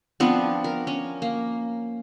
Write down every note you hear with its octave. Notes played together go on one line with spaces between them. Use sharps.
F3 B3 C4 D4
A#4
C#4
A#3